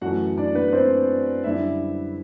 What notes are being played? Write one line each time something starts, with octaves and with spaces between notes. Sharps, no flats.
F#2 E3 A3 F#4 F#5
D4 D5
B3 B4
C4 C5
F#2 D3 G3 E4 E5